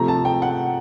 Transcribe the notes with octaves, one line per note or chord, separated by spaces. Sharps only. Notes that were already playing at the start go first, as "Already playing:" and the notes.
Already playing: C3 F3 A3 A#5
A5
G5
F#5